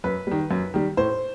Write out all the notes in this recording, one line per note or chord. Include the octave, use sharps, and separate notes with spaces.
F#2 B4
D#3 G3
F#2
D#3 G3
A2 C5